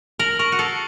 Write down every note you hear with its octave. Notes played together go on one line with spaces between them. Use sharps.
A#4 F#7
A#4 C#6
F#4
A4 C7